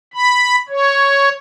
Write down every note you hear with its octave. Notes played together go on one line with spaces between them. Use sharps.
B5
C#5